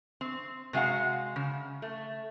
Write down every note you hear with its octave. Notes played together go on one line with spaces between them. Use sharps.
C4
C3 G#3 F#4 F5 F#5
C#3
A3